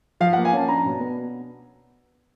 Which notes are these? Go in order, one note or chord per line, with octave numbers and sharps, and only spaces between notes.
F3 F5
A#3 F#5
G#5
C#4 A5
D4 A#5
B2
B3